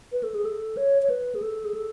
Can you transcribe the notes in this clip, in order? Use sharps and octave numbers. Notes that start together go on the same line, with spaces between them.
B4
A4
G#4
A4
C#5
C#5
B4
G#4
A4
G#4
A4